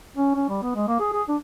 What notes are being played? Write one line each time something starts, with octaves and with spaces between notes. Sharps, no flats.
C#4
C#4
G3
B3
G#3
A#3
G#4
G#4
D4